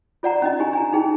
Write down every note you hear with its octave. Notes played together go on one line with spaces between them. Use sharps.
F4 D5 F#5 A#5
C#4 D4 D#5
E4 G4 G#5
D4 G#5 A#5
D#4 E4 G#4 G5